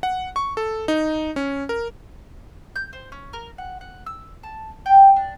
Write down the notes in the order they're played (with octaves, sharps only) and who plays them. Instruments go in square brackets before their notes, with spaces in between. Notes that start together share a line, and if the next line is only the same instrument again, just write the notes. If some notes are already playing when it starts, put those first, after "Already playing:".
[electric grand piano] F#5
C#6
A4
D#4
C#4
A#4
[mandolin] G6
C5
C#4
A#4
F#5
F#5
E6
A5
G5
D4